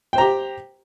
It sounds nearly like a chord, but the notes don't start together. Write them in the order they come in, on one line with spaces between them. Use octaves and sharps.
G5 C5 A#5 G4